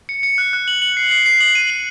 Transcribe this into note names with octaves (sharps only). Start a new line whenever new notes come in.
C#7
C#7
F#6
F#6
F#7
F#7
C7
C7
C7
F#7
D#7
F#7